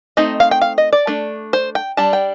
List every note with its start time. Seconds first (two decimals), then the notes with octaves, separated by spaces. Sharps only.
0.17 A3 C4 D#4 D#5
0.40 F5
0.51 G5
0.61 F5
0.78 D#5
0.93 D5
1.07 A3 D4
1.53 C5
1.75 G5
1.97 G3 D4 A5
2.13 G5